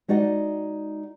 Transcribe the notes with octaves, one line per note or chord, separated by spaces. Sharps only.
G#3 D#4 F#4 D5 F#5